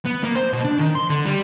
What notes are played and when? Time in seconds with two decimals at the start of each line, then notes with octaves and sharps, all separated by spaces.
0.05 B3
0.24 A#3
0.36 C5
0.53 B2
0.64 D4
0.79 D#3
0.95 C6
1.10 D3
1.25 G3